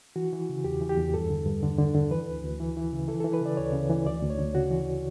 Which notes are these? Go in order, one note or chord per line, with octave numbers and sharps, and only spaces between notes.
E3 F#4
E3
C#3
E2 G4
E3
G4
E2
G2 A4
D3
G2
D3
D3
D3
E3 B4
D2
D2
E3
E3
C#3
E3 A4
A4
E3
B4
C#3 D5
D2 C#5
C#3
E3
D2 D5
D2
C#5
D2
C#3 F#4
E3